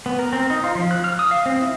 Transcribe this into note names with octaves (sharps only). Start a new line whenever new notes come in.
B3
A#4
C4
D#4
F4
F3
F#6
F6
D#6
F5
C4
E4